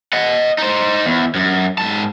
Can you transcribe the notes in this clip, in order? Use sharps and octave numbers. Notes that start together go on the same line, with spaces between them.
D#5 F#5
D#4 C5
E2
F#2
G#2 A5